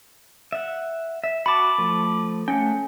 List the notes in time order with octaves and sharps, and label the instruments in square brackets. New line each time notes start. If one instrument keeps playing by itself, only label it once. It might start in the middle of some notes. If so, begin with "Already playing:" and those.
[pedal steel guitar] E5 F#5
E5
[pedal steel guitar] F#4 A5 [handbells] B5 D6
[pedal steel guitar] F3 A3
[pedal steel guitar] A3 F#5 G5 [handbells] C#4